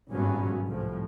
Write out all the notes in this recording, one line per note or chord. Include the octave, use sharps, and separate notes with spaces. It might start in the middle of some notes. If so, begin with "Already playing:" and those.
G#1 G2 A#2 F#3 B3 C#4
C2 A2 F3